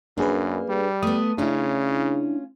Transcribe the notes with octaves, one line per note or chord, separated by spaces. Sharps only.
F#2 A#3 D4 G#4 B4
G3
A3 B3 D#6
C#3 C#4 D4 E4 F4